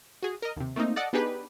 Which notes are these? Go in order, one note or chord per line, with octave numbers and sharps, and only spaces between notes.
F#4 G#4
A#4 D#5
D#2 C3
A3 A#3 C4 D#4
A4 D5 D#5 F#5
B3 D4 D#4 G4 G#4 B4